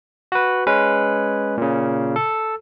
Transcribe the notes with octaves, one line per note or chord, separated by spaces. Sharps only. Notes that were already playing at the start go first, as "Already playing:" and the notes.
F#4 B4
G#3 C#4 B4
A#2 C#3
A4